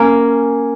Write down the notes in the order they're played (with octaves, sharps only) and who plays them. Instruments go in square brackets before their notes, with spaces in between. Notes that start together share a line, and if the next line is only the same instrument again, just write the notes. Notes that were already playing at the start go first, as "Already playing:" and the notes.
Already playing: [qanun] A#3 C#4